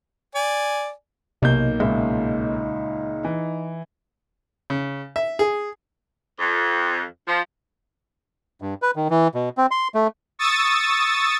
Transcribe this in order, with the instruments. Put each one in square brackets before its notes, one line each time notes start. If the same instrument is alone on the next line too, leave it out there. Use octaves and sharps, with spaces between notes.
[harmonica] D5 G#5
[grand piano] B1 A#3 G6 [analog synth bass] C3 [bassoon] D#4
[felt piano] C#2 A#2 E5 [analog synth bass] G#3
[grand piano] E3
[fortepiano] C#3
E5
G#4
[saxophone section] F2
F3
[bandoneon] G2
B4
D#3
E3
B2
C4
C6
A3
[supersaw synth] C#6 D#6 E6 A6